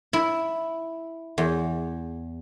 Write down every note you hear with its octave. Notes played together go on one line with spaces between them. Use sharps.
E4
E2